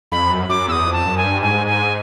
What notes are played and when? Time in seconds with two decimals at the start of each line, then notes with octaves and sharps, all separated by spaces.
0.12 F2 B5
0.31 F#2
0.49 F#2 D6
0.68 E2 E6
0.72 D#6
0.86 F2
0.93 A5
1.06 F#2
1.18 G#5
1.24 G2
1.42 G#2 G#5
1.67 G#5